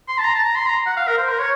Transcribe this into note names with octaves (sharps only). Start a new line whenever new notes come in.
C6
A5
A#5
A5
A#5
C6
A#5
F#5
F5
A#4
C5
A#4
C#5